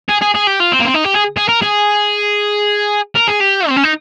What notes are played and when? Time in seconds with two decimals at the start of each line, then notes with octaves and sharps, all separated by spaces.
0.09 G#4
0.22 G#4
0.35 G#4
0.47 G4
0.60 F4
0.72 C4
0.80 A#3
0.85 C4
0.94 D#4
1.05 G4
1.15 G#4
1.37 G#4
1.49 A#4
1.62 G#4
3.15 A#4
3.27 G#4
3.40 G4
3.68 C4
3.76 C#4
3.83 D#4